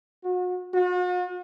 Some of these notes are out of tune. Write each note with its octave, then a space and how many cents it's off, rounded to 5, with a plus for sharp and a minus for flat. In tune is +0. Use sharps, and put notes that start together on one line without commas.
F#4 -35
F#4 -45